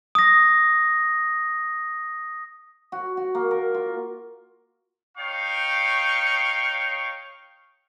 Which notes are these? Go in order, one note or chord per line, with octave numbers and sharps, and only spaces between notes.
D#6 A#6
F#4
F#4
A#3
A#4
F4
D#4 C#5 F5 G5 C#6